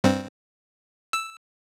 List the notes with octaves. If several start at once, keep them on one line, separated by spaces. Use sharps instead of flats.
G2 C4
E6